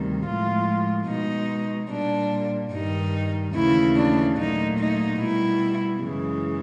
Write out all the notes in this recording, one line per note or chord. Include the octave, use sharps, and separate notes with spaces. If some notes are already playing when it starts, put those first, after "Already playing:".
Already playing: D2 C3 D#3 G3
A2 F3 G#3 F4
B2 G#3 D#4
A#2 G3 D4
G2 D#3 G3 D#4
D#2 C#3 E3 A3 E4
D4
A#2 F#3 A3 D#4
D#4
B2 G3 E4
F#2 C#3 E3 G#3